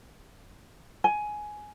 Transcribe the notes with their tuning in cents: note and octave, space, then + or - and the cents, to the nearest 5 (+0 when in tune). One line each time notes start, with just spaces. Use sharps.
G#5 +15